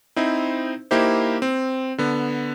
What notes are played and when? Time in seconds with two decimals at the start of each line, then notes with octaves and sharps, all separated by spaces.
0.16 C4 D#4 E4 C5
0.91 A#3 D#4 E4 G4 C5
1.42 C4
1.98 D3 B3